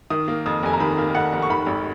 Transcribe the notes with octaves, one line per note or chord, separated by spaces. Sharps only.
D#3 D#6
A#3
F2 D#6
F1 G#5
A#5
D#3 B5
A#3
F2 F#5
F1
C#6
D#3 B5
G#1